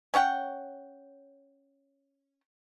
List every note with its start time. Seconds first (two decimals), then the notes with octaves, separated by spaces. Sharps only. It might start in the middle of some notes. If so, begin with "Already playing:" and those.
0.14 C#4 C#5 F#5 G5